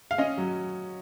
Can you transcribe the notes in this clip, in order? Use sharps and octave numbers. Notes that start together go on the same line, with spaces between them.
F5
C#4 D#5
F#3